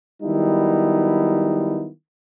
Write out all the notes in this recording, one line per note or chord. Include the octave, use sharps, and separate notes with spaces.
D#3 F#3 G3 B3 D#4 E4